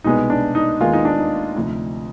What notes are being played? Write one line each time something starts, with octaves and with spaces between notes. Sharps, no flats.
C2 B2 G#3 B3 D#4
D4
D#4
D#2 D#3 G#3 B3 F4
D#4
D4
D#4
D2 C3 F3